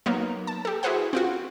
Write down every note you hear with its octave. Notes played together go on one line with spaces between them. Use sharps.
F#3 A#3 B3 D#4
A5
G4 A4
E4 F#4 G#4 B4 C5 F#5
C4 F4 F#4